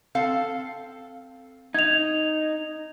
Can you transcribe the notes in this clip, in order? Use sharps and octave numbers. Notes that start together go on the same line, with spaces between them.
C4 A4 F5
D#4 G#6 F7